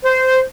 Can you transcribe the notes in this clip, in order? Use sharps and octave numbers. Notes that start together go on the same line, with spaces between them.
C5